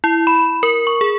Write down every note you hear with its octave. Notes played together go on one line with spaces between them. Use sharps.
E4
B5
A#4
C#6
G#4